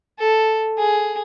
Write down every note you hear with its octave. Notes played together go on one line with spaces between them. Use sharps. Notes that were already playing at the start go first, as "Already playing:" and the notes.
A4
G#4